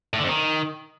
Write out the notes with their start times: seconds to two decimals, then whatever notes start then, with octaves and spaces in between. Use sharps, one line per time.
0.13 A2
0.19 D3
0.24 F2
0.29 D#3